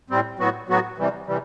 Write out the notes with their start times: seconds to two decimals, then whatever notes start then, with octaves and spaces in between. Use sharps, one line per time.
0.10 A2 G3 C4
0.39 A2 F#3 B3 F#4
0.68 A2 F#3 B3 F#4
0.98 C3 E3 G3
1.27 C3 E3 G3